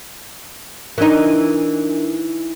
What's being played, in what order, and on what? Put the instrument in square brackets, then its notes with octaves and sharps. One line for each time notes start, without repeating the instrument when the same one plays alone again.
[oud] E3 D#4 [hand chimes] D4 A#4